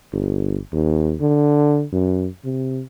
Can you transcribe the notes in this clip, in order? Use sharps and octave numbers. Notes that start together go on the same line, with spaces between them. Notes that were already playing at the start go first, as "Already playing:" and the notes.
G1
D#2
D3
F#2
C3